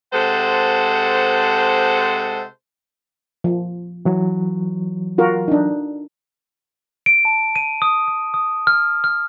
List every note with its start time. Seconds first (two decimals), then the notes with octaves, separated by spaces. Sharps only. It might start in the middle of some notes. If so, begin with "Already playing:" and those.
0.13 C3 G#3 A4 C5 F#5 A5
3.44 F3
4.05 E3 F#3
5.18 F4 F#4 A#4
5.48 D4 D#4
7.06 D7
7.25 A5
7.56 D#7
7.82 D#6
8.08 D#6
8.34 D#6
8.67 F6
9.04 F6